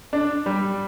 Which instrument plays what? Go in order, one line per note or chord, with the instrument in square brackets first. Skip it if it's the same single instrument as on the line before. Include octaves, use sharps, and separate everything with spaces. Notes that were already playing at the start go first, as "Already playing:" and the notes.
[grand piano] D4
G3